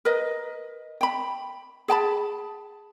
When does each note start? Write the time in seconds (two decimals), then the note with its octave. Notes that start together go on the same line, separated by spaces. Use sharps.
0.05 A#4 B4 D#5
1.01 G5 B5
1.88 G#4 G5 A5 B5